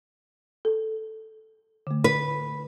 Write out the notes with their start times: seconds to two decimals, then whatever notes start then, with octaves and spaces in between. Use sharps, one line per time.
0.65 A4
1.87 D3 A3
2.04 B4